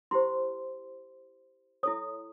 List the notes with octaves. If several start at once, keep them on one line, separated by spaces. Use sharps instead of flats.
E4 G4 C5 C6
E4 A4 C#5 D#6